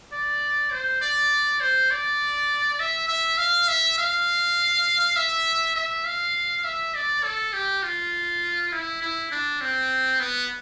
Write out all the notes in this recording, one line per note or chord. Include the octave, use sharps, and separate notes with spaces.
D5
C5
D5
C5
D5
E5
E5
F5
E5
F5
E5
E5
F5
E5
D5
A4
G4
F4
E4
E4
D4
C4
B3